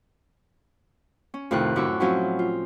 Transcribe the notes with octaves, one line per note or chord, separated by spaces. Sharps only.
C#4
F2 A2 C3 D#3 F#6
F#2 A2 E4 C#6 D6 E6
F3 F#3 C4 C#4 E4
F4